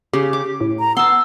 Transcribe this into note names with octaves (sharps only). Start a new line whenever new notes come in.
C#3 G4
D6
A2
A#5
B3 A5 C6 E6